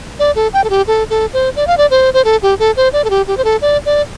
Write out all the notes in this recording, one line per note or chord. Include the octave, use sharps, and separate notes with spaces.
D5
A4
G5
A4
G4
A4
A4
C5
D5
F5
D5
C5
C5
A4
G4
A4
C5
D5
A4
G4
G4
C5
A4
D5
D5